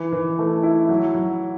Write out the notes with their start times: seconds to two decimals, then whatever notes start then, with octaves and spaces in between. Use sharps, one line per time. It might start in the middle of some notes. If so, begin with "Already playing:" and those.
Already playing: E3
0.12 E3
0.39 A3
0.63 E4
0.89 F#3
1.15 F#3